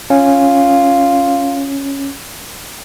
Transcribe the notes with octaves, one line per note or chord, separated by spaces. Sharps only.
C#4 F4